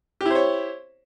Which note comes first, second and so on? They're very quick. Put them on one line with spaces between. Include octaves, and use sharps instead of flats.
G4 E4 C5 C#5